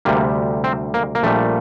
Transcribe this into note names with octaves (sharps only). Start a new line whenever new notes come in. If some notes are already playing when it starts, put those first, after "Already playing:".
D2 C3 G3 A#3
C4
A#3
A#3
A#1 A#2 G3 A3